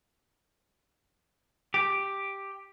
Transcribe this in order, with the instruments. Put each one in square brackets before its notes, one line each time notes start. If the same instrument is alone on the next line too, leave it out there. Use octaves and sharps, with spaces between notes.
[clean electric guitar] G4